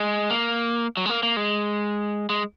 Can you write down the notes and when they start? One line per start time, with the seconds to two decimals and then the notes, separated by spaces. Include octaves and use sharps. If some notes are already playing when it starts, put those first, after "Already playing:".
Already playing: G#3
0.31 A#3
0.97 F#3
1.05 G#3
1.10 A#3
1.23 A#3
1.37 G#3
2.30 G#3